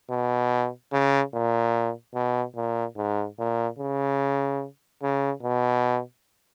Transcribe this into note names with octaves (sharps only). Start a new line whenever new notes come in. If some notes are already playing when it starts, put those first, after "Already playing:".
B2
C#3
A#2
B2
A#2
G#2
A#2
C#3
C#3
B2